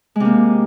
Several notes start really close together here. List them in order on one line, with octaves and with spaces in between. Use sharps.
G#3 C3 A#3